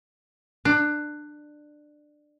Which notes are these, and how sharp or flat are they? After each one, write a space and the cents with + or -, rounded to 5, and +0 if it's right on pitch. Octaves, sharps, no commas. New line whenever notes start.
D4 +20